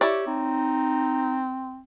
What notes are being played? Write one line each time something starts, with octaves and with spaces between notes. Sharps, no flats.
E4 G4 C#5 D5
C4 D#4